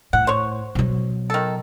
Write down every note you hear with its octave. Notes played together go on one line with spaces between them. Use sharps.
A2 F#5
C5 C#5
B2 F#3
D#3 A4